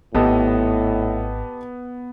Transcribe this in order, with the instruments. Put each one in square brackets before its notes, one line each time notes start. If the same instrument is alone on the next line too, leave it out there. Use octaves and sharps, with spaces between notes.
[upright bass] G#1 [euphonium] A2 [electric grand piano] B3 [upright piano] G4 A4 D#5